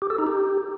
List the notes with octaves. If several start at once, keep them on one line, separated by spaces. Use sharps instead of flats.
G4
A4
D#4
G4